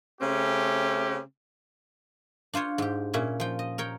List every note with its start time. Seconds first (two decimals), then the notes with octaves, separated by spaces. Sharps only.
0.21 C#3 A3 C4 C#4 G4
2.54 D4 F4 C5 C#5
2.78 G#2 G4
3.13 A#2 C#4 E4
3.40 F3 G5
3.59 D#5
3.78 A#4 C#5 G5